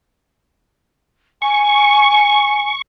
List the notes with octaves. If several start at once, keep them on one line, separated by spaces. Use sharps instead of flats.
G#5 C#6